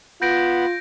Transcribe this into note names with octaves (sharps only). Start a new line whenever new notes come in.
B3 F4 F#5 B5 G6 A#6 D7